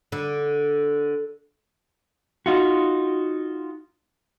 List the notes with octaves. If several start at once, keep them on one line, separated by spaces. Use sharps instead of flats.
D3
D#4 F4 F#4